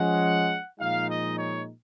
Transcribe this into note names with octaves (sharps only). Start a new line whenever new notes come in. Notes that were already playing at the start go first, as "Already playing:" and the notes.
Already playing: F3 G#3 C#4 F#5
A#2 F3 G#3 D#4 F5
D#5
C#5